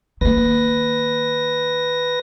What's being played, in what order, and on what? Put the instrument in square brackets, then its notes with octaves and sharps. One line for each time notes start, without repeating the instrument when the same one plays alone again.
[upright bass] D#3 A#3 [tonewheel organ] B4 A#6